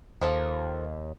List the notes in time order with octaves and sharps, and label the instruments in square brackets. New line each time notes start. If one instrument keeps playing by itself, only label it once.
[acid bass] D#2 [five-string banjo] F3 A#3 A4